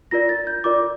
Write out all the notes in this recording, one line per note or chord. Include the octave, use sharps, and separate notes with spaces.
F4 A#4 D5 A#6
A6
G6
F4 A#4 D5 D6